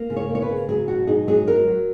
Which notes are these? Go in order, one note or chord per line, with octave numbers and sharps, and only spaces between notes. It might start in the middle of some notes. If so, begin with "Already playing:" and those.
Already playing: A#3
C#3
C#5
A#3
C#5
B4
C#3
F#3 G#4
B2 F#4
D#4 G#4
F#3 G#4
F#3 A#4
F#3